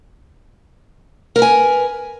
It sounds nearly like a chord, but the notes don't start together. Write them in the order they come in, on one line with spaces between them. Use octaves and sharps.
A#4 B4 G#5